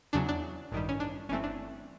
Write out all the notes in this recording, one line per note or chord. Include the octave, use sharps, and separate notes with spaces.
E2 C#3 F#3 D4
D4
A1 G2 D#3 G3
C#4
D4
G1 G2 E3 A3 C4 C#4
D4